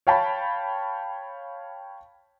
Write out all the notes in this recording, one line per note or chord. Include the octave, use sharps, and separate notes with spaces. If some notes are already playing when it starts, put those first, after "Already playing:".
C#5 F5 G5 A5 B5